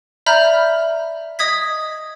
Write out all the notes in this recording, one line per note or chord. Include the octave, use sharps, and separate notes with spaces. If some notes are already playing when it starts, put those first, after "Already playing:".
D5 E5 A#5 B5 F6 G6
D#5 D#6 G#6 B6